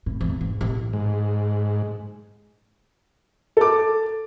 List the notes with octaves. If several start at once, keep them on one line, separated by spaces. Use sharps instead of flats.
A2
E2
G#2
A1
G#2
A4 D6